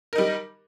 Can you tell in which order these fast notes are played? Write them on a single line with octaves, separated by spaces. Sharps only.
A#4 D#4 G3